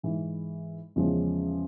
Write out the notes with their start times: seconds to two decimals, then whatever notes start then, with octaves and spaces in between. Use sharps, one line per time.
0.03 G#2 E3 G#3
0.96 E2 C#3 F3 G#3 C#4